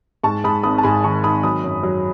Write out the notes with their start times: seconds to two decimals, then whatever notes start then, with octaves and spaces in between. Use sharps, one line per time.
0.23 G#2 A5 C#6
0.44 G#2 B5 D#6
0.63 G#1 B5 D#6
0.78 A5
0.83 G#2 G#5 B5
1.04 D#3 A5 C#6
1.24 D#3 B5 D#6
1.43 F#3 B5 D#6
1.64 F#2
1.83 F#3